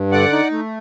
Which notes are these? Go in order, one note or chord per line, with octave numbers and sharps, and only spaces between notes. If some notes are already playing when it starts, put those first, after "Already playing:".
Already playing: G2
D3 D5 F#5
D#4
A3